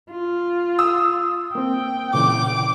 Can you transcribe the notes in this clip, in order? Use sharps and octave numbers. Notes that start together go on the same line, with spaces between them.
F4
D#6 E6
A#3 C4 G5
A#2 C#3 E3 D6